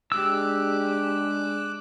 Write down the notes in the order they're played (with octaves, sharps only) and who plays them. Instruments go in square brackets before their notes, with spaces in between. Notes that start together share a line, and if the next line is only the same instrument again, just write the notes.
[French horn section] G#3 D4 [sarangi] G4 [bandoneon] D6 F#6 [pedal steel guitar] E6